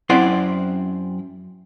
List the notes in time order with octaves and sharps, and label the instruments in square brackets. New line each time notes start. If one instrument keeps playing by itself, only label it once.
[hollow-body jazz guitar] F#2 C4 E4 D5 F#5 C6